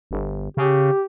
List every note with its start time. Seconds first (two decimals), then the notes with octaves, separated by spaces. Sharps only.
0.11 G1
0.57 C#3 G4